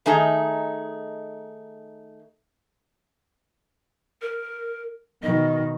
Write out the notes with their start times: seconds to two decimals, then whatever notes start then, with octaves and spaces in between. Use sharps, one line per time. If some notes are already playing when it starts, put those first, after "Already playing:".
0.06 D#3 A3 D#4 G#4 A#5
4.22 A#4
5.23 B2 D#3 D#5